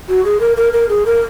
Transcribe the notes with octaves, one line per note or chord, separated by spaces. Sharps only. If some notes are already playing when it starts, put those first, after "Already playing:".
F#4
G#4
A#4
A#4
A#4
G#4
A#4